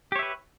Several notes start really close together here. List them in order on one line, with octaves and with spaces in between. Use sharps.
G4 C#5 E5 B4